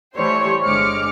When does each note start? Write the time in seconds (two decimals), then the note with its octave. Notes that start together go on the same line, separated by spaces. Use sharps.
0.15 E3 G3 A3 G4 C5 C#5
0.64 G1 D3 G#3 D6 F6 C#7